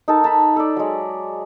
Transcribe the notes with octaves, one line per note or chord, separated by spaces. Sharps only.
D#4 A4 A#4 A5
A5 B5
A4 D5
F#3 G#3